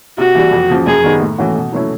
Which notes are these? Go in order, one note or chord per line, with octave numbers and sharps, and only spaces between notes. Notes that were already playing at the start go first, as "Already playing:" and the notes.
C3 F#4
E3 G3
F2
C#3 F3
F#2 G#4
D#3 G3 B3 D#4
A2
E3 A3 C#4 F#4
B2
F#3 A3 C#4 E4